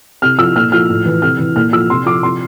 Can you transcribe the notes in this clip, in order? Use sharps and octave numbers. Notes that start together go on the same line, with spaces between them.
C3 F6
F3 E6
A#2 F6
F3 F6
A2
E3
C3 F6
E3
A#2 F6
F3 E6
C3 C6
F3 D6
C3 C6